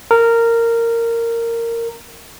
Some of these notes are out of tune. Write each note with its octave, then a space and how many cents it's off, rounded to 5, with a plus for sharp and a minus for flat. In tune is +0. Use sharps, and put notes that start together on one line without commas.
A#4 -15